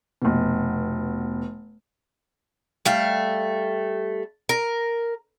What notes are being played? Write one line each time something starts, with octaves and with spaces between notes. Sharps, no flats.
F1 B2
G3 A3 F5
A#4